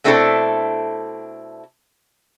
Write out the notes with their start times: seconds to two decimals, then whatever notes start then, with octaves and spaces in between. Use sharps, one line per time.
0.04 B2 A3 C4 D4 E4 A4